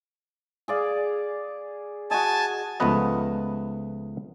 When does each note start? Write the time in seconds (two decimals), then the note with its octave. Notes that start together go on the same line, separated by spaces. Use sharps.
0.68 G#4 D5 F5
2.11 F#4 D#5 G#5 A5
2.80 C#2 F3 A3 B3 B4 D#5